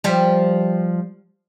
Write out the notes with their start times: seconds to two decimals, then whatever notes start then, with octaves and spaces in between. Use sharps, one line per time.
0.04 F3 G3